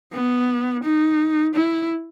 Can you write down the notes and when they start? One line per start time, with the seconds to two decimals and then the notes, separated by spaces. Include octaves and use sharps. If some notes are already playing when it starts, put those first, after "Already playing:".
0.13 B3
0.83 D#4
1.54 E4